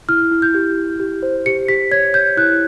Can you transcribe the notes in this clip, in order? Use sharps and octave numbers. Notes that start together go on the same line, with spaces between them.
E4 F6
E4
G6
G4
E4
G4
C5
G4 C#7
G4 B6
C#5 G#6
C#5 G6
E4 F#6